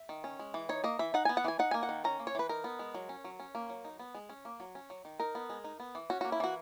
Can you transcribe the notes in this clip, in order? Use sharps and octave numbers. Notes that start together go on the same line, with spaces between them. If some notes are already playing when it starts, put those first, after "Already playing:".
Already playing: E5
D#3
C#4
G#3
E3
D#4 C#5
A#3 D#5
E3 E5
D#4 F#5
B3 G#5
F#5
E3 G#5
D#4 F#5
A#3 G#5
F#5
D#3
C#4 A#5
A#3
C#5
E3 B4
D#4 A#4
B3
G#3
F#3
C#4
F#3
C#4
A#3
F#3
D#4
B3
G#3
C#4
A#3
F#3
C#4
F#3
D#3
D#4 A#4
B3
G#3
D#4
B3
E3
C#4 F#4
A#3 F#4
E4
E3 F#4